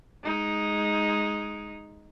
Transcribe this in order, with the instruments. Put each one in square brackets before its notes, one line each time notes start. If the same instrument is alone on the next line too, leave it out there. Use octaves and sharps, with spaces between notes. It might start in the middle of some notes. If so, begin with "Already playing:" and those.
[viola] G#3 D#4